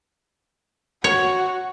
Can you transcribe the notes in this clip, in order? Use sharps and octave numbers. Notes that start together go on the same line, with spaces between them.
F#4 C#5